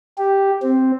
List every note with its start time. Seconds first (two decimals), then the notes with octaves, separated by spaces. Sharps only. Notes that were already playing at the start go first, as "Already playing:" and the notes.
0.18 G4
0.62 C4